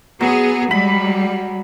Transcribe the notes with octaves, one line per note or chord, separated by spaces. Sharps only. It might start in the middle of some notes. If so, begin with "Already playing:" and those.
F#3 B3 G#4
G3 G#3 B5